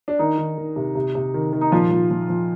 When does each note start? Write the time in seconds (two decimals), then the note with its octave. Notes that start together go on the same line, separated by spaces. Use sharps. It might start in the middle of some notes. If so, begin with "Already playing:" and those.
0.08 D4
0.19 D#3 D#4
0.38 D#3
0.58 D#3
0.76 C3
0.95 C3
1.15 C3
1.34 D#3
1.53 D#3
1.61 D#4
1.71 A#2 F3 F4
1.91 F3
2.11 F3
2.29 F3